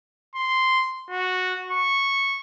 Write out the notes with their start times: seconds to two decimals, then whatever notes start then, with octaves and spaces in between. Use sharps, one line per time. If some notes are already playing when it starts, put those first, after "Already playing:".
0.35 C6
1.10 F#4
1.71 C#6